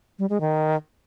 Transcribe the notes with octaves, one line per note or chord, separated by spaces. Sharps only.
G3
G#3
D#3